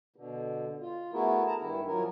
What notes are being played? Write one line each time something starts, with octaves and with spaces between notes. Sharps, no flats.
B2 D3
F4
A3 B3 E4 F#4 G#4 A#4
A5 A#5
G2 D#3 E4
F3 F#3 A#4